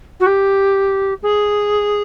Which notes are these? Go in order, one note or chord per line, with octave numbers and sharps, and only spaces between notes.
F#4
G4
G#4